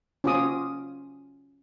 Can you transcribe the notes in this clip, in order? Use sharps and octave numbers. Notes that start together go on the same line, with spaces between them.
C#4 F4 F#4 C5 D6 D#6